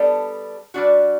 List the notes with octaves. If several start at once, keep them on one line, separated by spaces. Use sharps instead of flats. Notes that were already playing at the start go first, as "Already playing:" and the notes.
Already playing: G3 B3 D4 A4
G3 D4 F#4